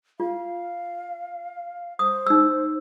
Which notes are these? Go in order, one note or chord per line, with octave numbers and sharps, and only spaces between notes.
F4 F5
C5 D#6
D#4 E6